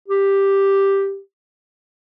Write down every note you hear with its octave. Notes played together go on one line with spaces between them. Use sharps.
G4